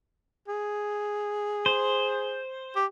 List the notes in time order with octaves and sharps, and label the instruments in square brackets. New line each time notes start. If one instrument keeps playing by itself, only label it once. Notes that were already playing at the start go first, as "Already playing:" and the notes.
[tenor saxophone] G#4
[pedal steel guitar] C5
[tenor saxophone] G4